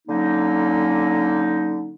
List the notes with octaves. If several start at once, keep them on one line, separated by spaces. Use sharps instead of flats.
D3 F#3 A#3 C#4 D#4